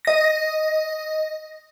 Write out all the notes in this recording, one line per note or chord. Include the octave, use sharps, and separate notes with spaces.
D#5 A#6